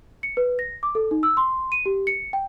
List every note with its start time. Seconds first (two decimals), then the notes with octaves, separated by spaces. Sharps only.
0.23 C#7
0.37 B4
0.59 A#6
0.83 D6
0.95 A4
1.11 D#4
1.23 E6
1.37 C6
1.72 D#7
1.86 G4
2.07 C#7
2.33 G5